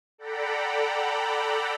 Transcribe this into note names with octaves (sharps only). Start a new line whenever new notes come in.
A4 D5 F#5 G5 A#5 B5